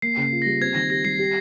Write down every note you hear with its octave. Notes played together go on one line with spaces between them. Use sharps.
A#3 C7
C#3
C7
F4
G3 A#6
C4 G#6
D#3 A#6
G4 A#6
G3 C7
G4